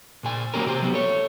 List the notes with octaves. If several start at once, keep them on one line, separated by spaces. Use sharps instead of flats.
A#2 G#4 G#5
F#3 A#3 C#4 G4 A#4
C3 G4 C5
F#3 B3
A4 C#5